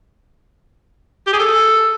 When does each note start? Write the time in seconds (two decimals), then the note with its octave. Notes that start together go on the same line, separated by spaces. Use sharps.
1.27 G4
1.33 G#4
1.39 A4